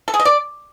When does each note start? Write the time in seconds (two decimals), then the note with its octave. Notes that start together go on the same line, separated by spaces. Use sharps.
0.08 A4
0.14 G#4
0.20 D#5
0.25 D5